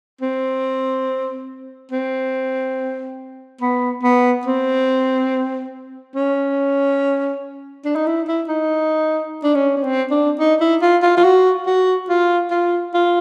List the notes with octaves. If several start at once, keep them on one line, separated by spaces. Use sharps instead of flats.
C4
C4
B3
B3
C4
C#4
D4
D#4
E4
E4
D#4
D4
C#4
C#4
C4
D4
D#4
E4
F4
F4
F4
F#4
F#4
F4
F4
F4